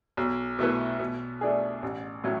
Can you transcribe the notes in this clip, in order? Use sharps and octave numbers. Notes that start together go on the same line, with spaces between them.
B1
B2 A3 E4 B4
B2
A3 D4 G#4
A1
A2 F#3 A3 C#4